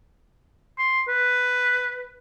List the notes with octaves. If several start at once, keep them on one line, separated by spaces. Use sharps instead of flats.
C6
B4